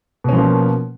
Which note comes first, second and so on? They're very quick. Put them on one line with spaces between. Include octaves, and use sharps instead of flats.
B2 C#4 F3 A#3